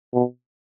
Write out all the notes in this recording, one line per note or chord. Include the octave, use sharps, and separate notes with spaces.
B2